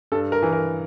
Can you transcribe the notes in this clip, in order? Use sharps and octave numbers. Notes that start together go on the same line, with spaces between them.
G2 A4
A#4
E3
A#4